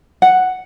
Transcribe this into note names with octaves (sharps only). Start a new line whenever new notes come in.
F#5